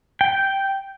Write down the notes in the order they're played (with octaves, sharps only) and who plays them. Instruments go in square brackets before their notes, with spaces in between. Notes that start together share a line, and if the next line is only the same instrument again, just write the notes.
[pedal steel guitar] G5